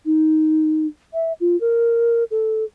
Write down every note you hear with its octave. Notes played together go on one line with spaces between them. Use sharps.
D#4
E5
F4
A#4
A4